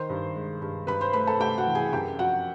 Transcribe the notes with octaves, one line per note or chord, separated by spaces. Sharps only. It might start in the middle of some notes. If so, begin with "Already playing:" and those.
Already playing: D#3 C5 C6
G2
G#3
G2
G2 B4 B5
C5 C6
A3 B4 B5
A4 A5
A3 G4 G5
F#4 F#5
E3
G#4 G#5
F#2 G4 G5
F3 F#4 F#5